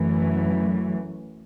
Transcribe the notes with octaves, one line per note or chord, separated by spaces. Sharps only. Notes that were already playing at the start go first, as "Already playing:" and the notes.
Already playing: F#2 E3 A3